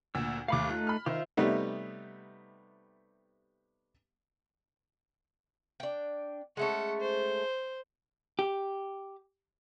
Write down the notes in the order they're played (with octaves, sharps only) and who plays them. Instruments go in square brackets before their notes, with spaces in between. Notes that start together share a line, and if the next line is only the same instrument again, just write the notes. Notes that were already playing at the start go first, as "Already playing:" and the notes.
[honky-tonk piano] D2 A#2 [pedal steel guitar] E6
[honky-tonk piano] D#2 A3 [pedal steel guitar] F5 B5 D6
[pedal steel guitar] A3 D#4 F#6 [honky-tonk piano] F4
[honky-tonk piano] B5 F6
[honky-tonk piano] D#3 [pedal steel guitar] F4 C5 E5
[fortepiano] C3 G3 A3 B3 D#4
[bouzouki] D4 G5
[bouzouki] G#3 A3 C#4 [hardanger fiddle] A4 F#5
[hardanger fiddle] C5
[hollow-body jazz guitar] G4